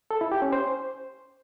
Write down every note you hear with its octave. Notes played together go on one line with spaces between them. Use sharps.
A4
E4
G4
C#4
C5